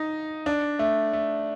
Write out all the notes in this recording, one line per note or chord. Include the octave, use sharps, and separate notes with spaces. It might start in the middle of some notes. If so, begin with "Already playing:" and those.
Already playing: D#4
D4
A3
A3